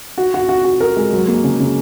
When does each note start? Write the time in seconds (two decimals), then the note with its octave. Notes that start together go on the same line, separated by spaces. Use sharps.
0.18 F#4
0.34 F#4
0.49 F#4
0.65 F#4
0.81 A#4
0.97 G#3
1.13 F#3
1.28 A#3
1.44 C#3
1.60 C#3